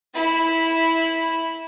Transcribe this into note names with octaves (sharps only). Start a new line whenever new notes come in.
E4 B5